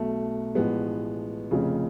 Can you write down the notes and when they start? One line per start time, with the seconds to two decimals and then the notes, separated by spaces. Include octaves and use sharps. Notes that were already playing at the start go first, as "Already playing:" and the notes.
Already playing: B1 B2 A3
0.55 A1 A2 F3 G#3 B3
1.51 F1 F2 C#3